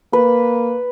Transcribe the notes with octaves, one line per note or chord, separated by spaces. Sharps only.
A#3 B4